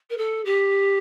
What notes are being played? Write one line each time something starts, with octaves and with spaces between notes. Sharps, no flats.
A#4
A4
G4